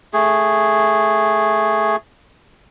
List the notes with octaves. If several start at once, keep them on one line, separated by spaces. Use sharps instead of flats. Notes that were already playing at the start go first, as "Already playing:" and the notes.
A3 G#4